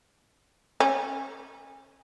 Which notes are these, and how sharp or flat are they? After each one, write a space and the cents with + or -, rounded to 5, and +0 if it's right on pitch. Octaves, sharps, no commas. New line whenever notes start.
C#4 -30